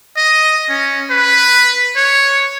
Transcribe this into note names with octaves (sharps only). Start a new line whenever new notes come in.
D#5
C#4
B4
C#5